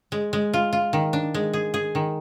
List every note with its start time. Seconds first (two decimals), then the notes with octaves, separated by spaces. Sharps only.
0.12 G#3
0.33 G#3
0.54 F4
0.73 F4
0.93 D#3
1.13 D4
1.34 G#3
1.53 G#4
1.74 G#4
1.95 D#3